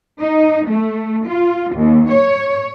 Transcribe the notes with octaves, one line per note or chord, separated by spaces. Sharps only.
D#4
A3
F4
D#2
C#5